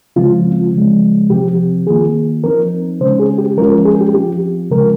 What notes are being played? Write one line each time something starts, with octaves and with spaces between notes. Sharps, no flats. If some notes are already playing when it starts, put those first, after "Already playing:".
C#3 F3 G#3 C4 F4
C#3 F3 G#3
C3 F3 C4 G4
D#3 A#3 F4 G#4
F3 C4 D#4 A#4
C#3 G#3 C#4 C5
G#4
G4
F3 G#3 C#4 F4 A#4
A#4
G#4
G4
F3 C4 F4 G4
C#3 F3 G#3 A#4